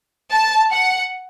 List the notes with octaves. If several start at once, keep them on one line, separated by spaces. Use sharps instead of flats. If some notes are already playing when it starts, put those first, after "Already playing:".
A5
F#5